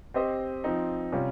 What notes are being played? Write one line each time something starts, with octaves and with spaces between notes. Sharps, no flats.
C4 G4 C5 D#5
F3 C4 D#4
C3 G3 C#4 F4